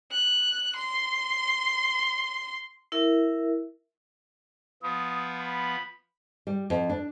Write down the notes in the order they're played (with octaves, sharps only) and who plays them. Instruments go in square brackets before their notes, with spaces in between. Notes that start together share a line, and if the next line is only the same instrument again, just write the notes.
[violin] F#6
C6
[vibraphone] E4 A#4 E5
[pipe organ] F3 B3 [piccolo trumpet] D#6
[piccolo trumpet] B5
[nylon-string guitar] G3
F2
D4